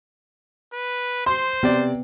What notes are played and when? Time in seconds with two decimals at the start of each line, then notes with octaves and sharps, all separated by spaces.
0.73 B4
1.26 C5 C6
1.63 C3 B3 D5